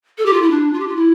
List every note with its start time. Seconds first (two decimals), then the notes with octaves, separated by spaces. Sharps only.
0.18 A4
0.26 G4
0.33 F4
0.42 E4
0.50 D4
0.73 F4
0.80 G4
0.88 F4
0.96 E4